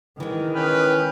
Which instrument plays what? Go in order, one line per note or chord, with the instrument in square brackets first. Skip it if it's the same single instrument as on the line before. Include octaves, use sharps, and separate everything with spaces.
[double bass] D#3 [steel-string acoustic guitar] E3 G#3
[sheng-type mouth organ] C#4 G5 F6 [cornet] B4